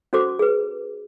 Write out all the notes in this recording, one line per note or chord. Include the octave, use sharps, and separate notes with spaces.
C#4 F#4 A4 C5 D6
G#4 B4